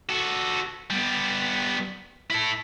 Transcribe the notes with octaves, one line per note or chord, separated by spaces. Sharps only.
F#4 A4
G3 B3
E4 A4